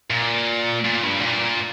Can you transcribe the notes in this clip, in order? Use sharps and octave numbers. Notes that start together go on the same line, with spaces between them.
A#2
A#2
G2
A#2